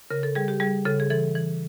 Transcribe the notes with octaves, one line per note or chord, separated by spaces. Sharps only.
C#3 A#4
A4
G3 G#4
G4
G3 G#4
C#3 A4
G#4
E3 A4
E3